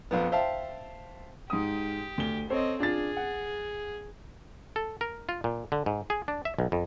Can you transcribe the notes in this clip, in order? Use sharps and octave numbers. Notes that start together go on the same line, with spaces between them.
A#1 F2 B3
C5 E5 F5 G5 A5
G#2 G4 D#6
D2 G7
C4 A4 C5 C#5 D#5
D4 F4 G#4 A6
F#5
A4
A#4
F4
A#2
D3
G#2
G#4
D4
E5
B1
F2